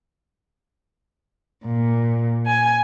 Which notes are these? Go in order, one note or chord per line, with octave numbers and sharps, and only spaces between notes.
A#2
G#5